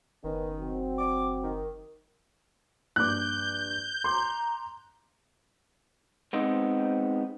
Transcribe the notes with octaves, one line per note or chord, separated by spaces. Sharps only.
F#1 D#3 B3 C#4 B4
F#3 C4
D6
D#3
A#1 G2 D6 F#6 G6
A#5 C6 D6
G#3 B3 C4 D#4 C5